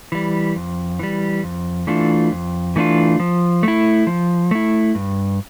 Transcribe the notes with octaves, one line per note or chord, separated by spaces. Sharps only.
E3 G3
F2
E3 G3
F2
E3 A3 D4 F4
F2
E3 A3 D4 F4
F3
A3 E4
F3
A3 E4
G2